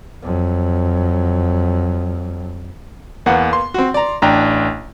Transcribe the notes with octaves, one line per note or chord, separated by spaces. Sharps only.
F2 F#3
E2 A#3 B3 F#5
C6
C4 F#4
D5 A#5
A1 D4 G5 A#5